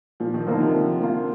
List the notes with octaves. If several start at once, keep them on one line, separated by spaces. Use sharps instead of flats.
A#2 F3
D#3
D3 F3 A#3 D#4
C3
D3 F3
A#3 F4